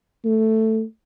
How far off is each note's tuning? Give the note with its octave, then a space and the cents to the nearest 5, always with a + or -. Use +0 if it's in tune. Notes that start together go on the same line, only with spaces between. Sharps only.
A3 +5